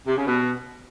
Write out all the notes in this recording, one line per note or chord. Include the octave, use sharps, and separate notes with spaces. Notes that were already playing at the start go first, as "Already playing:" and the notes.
C3
C#3
B2